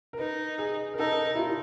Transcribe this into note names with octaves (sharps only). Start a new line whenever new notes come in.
A#4
D#4 B4
G#4
A#4
D#4 A4
A#4
A#4
E4
F4